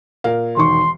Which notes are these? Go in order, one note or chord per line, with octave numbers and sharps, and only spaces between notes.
A#2 A#4 F5
E1 D#3 C6 C#6